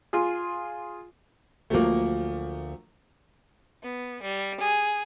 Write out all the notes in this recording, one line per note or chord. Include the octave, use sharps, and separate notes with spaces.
F4 G#4
D2 F3 F#3 A3 A#3
B3
G3
G#4